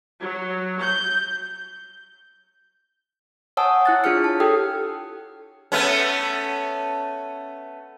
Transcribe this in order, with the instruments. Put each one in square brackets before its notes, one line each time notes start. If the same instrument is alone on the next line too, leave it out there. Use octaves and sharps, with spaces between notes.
[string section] F#3
G6
[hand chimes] C#5 F#5 G#5 A5 D#6 E6
E4 F#6 A6
D4 F4 G#4 C#5 F6 C#7
A5
D4 G4 A4 G5 D#6 E6
[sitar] A3 B3 C#4